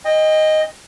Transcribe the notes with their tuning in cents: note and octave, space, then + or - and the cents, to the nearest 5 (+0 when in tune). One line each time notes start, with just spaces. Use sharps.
D#5 +0 G5 +35